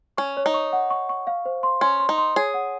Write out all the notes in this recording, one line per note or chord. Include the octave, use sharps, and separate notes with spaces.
C#4 C#6
C#5
D#4
C#6
F#5
C#6
C#6
F5
C5
C6
C#4 C6
C6
D#4
C6
G#4 C#5
F#5